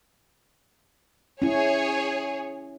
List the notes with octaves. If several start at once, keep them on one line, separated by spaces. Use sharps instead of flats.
C#4 E4 G#4 C#5